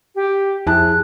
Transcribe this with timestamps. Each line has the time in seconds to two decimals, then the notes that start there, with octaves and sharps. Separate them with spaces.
0.15 G4
0.67 F2 E4 G#4 A5 F#6